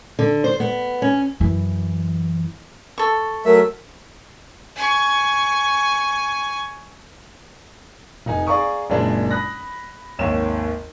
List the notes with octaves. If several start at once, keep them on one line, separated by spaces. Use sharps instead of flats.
D3
C5
B3
C#4
F#2 E3
A4 C#6
F#3 A3 A#4 E5
G#5 C#6
F1 D#4 G#5
G#4 D5 F5 A#5 C#6 D#6
F#1 A#2 G#3 D4 A5
B5 D#6 F#6 A#6
G#1 D#2 C#5 E7